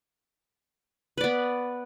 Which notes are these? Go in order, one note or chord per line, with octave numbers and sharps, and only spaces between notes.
B3 B4 D5